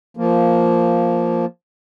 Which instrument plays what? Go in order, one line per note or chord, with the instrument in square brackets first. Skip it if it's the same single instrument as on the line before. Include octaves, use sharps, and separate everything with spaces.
[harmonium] F3 A#3